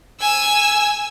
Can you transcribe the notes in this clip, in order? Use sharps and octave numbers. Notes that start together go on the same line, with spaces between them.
G#5 E6